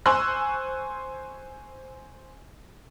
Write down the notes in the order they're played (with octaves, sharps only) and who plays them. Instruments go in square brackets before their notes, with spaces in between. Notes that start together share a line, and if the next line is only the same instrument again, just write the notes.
[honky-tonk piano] C5 G#5 C6 C#6 E6 F#6